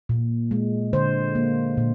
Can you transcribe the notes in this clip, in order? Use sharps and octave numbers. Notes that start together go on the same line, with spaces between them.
A#2
G#3
D3 C5
A#3
A#2